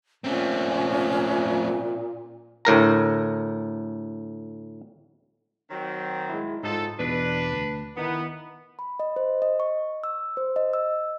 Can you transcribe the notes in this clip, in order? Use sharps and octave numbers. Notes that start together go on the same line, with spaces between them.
A#2 A3 C4 C#4
D2 A2 A#4 A#5
D#3 F#3 C4
G#3 E4
G#2 F#3 D#4 F4 A4
E2 B2 D4 B4 B6
D2
D#3 B3 D#4 E4
B5
D#5
C5
D#5
C#6
E6
C5
D#5
E6